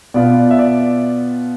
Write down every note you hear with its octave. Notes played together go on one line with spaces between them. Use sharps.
B2 B3 F4 D5
E5
D5